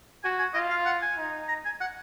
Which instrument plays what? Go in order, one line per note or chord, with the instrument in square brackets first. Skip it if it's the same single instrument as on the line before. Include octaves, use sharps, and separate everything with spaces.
[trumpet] F#4 [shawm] G#5
[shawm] G#5
[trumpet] F4 [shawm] D#5
[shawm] F5
F#5
G#5
[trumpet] D#4
[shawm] A#5
G#5
F#5